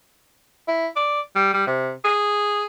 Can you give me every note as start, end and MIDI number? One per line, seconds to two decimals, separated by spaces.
0.68 0.88 64
0.96 1.20 74
1.36 1.53 55
1.54 1.64 55
1.67 1.92 48
2.05 2.66 68